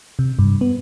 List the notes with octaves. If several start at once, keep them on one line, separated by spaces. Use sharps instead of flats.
C3
G2
B3